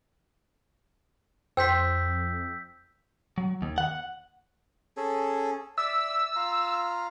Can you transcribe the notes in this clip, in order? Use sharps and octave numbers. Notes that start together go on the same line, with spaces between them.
F2 C5 G5 E6 G6 B6
F#3
D#2
F#5
C#4 G#4 A4
D5 E5 E6
F4 F5 A#5